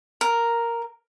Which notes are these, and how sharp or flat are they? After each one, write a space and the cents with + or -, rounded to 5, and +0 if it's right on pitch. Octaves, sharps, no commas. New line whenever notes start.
A#4 +0